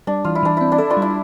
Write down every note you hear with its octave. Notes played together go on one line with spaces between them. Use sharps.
G3 D4
E3 F4
E4
E3 D4
C4 E4
D4
E4 A4
D4 F4
G3
E4